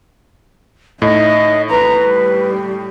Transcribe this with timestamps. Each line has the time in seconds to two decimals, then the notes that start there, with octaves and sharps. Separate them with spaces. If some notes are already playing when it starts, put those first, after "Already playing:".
1.02 A2 D#4 E4 D#5
1.70 B4 A#5
2.05 G3